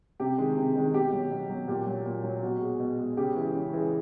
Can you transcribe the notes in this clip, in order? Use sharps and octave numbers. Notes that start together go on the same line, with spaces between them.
C3 G4
D#3 G#3
C3
D#3 G#3
B2 G4
F#3
B2
F#3
A#2 G4
F#3
A#2
F#3
B2 F#4
G#3
B2
G#3
C#3 G4
E3 G#3
C#3
E3 G#3